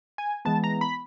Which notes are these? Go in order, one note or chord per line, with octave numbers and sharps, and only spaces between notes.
G#5
E3 G#3 B3 A5
A#5
B5